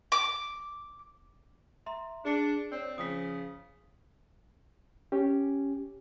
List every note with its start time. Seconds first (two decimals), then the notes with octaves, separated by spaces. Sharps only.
0.12 D6
1.86 E5 A#5 C6
2.25 D4 G#4 C#7
2.72 C4 C#5 D5
2.98 C#3 F3 D#6 B6
5.12 C#4 G4